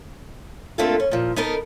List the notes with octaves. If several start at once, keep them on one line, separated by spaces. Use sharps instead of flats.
D3 A3 A#3 C4 F4 A4
C#4
A#2 F3
B3 D#4 A4 A#4